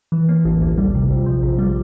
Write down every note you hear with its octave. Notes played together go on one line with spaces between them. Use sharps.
E3
A#3
A1
D2
G3
C3
A#1
F3
A#1
G3